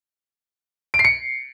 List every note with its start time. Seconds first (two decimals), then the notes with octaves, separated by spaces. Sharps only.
0.94 D7
0.99 C7
1.05 C#7